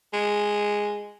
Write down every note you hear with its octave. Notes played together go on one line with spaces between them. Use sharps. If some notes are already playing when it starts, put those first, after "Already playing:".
G#3